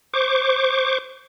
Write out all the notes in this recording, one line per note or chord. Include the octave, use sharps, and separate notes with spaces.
C5 C#6 D6